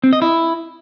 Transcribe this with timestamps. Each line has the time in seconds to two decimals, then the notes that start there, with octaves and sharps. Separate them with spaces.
0.04 C4
0.13 D#5
0.22 E4